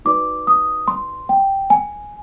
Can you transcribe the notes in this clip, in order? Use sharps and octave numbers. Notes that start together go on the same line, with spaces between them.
D#4 F#4 B4 D5 D6
D#6
C6
G5
G#5